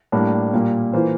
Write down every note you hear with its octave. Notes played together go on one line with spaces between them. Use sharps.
A2 G3 A#3 D4
A#2 G3 A#3
E3 A#3 F4 C5